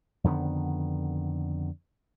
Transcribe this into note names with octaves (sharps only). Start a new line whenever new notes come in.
F2 D3 D#3 B3